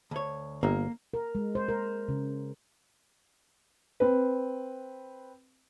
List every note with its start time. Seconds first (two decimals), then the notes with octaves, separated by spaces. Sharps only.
0.11 D2 C#5
0.63 G1 A#3
1.14 A#4
1.35 G#3
1.55 C5
1.69 A#4
2.08 C#3
4.00 C4 B4